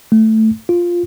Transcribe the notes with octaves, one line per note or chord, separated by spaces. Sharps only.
A3
F4